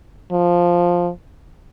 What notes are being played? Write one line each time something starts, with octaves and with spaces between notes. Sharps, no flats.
F3